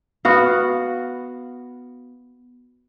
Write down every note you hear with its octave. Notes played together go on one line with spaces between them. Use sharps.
B3 F#4 F5